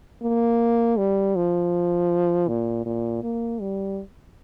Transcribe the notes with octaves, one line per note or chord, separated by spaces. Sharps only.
A#3
G3
F3
A#2
A#2
A#3
G3